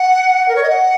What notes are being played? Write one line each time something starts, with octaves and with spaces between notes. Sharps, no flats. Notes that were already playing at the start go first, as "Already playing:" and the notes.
Already playing: F#5
A#4
C#5
D#5
F#5